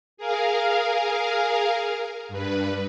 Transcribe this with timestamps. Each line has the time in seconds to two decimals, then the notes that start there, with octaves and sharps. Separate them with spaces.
0.17 G#4 A#4 F5
2.29 G2 B4